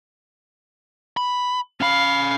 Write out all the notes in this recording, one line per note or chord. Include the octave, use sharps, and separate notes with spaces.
B5
C#4 F5 B5